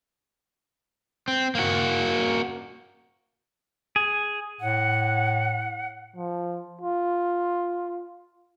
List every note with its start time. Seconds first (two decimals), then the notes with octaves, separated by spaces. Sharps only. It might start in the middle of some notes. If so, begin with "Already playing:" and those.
1.28 C4
1.55 A#3 F#4
3.96 G#4
4.61 A2 F#5
6.16 F3
6.81 F4